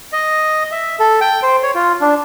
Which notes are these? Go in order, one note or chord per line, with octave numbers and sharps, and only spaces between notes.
D#5
E5
A4
G5
C5
C#5
F4
D4